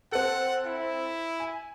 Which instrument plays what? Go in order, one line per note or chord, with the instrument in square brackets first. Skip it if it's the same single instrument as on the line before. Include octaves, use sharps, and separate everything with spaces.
[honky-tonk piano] C4 A4 [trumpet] F#5
[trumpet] E4
[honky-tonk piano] G#5